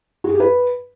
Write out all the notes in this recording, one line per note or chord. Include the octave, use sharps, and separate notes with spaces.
F#4
G#4
G4
B4